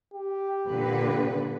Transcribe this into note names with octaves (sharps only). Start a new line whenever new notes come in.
G4
A#2 D3 B4